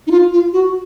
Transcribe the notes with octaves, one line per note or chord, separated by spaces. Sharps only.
D#4
F4
F4
F#4